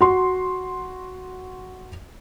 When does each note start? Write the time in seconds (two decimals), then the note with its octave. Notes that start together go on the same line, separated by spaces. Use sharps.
0.01 F#4 C6